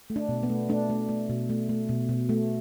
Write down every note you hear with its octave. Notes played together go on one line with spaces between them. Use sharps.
A3
D4
B2
B3
A3
A3 D4
A3
A3
B2
A3
A3
B2
B2
A3